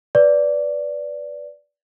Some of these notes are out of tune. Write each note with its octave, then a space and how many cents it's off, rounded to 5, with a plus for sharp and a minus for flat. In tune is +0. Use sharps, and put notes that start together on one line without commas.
B4 +0 D5 -10